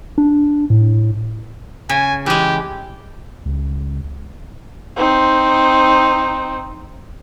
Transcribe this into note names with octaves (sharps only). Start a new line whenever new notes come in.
D4
A2
C#3 G#5
E3 G#3 G4
C#2
C4 D#4